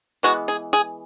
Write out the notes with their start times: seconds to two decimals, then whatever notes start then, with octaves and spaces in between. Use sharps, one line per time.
0.23 E3 G#3 B3 F#4
0.48 G#4
0.73 G#4